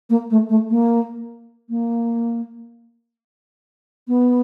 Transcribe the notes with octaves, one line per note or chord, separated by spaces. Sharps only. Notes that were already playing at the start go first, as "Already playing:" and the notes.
A#3
A3
A3
A#3
A#3
B3